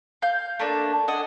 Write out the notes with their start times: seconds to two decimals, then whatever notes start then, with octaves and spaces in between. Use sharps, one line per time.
0.22 F5 G6
0.59 A3 A#3 D4
1.08 D4 D#5 F#5 G#5